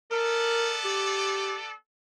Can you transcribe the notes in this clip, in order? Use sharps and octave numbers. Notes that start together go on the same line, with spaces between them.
B3 A4 A#4 D5
G4